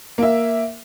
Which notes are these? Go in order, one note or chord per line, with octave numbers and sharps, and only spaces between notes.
A#3 E5